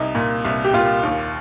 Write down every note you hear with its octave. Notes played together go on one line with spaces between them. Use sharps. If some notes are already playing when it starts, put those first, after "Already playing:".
Already playing: C2 D#4
A#2
C2
G4
A#2 F4
D#2